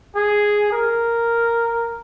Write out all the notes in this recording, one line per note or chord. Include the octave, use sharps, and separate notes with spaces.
G#4
A#4